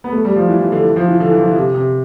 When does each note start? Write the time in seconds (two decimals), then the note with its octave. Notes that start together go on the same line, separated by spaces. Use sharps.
0.04 B3
0.12 A3
0.25 G3
0.36 F3
0.48 E3
0.61 E3
0.72 D3
0.84 E3
0.96 F3
1.09 E3
1.20 D3
1.30 E3
1.38 F3
1.48 E3
1.56 C3
1.75 C3